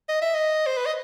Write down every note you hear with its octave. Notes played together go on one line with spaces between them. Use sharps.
D#5
E5
D#5
C5
B4
D#5